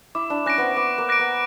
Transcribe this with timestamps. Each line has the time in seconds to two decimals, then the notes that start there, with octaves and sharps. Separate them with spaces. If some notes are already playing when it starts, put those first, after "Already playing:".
0.15 E4 D6
0.30 D4
0.46 C#4 F#6 A#6 D7
0.58 B3 C4
0.77 B3 D6
0.98 A#3
1.09 F#6 A#6 D7
1.19 B3